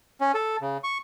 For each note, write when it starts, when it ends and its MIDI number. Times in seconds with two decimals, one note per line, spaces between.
0.21 0.32 61
0.34 0.57 69
0.61 0.78 49
0.84 0.98 85